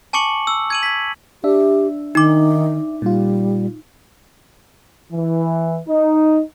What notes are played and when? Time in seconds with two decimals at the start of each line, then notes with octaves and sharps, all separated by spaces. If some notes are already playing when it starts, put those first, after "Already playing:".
0.13 G#5 A5 C#6 D6 C#7 F#7
0.47 E6
0.70 G#6 D#7 F#7
0.83 G#6 B6
1.44 D4 G4 E5
2.15 D#3 D#4 D6
3.02 A#2 G3 F4
5.13 E3
5.89 D#4